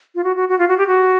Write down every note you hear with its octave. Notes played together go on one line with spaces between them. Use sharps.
F4
F#4
F#4
F#4
F4
F#4
G4
F#4